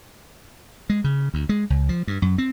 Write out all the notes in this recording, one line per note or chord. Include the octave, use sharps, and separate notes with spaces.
G#3
C#3
D2
G#3
C#2
F3
G2
F#2
C4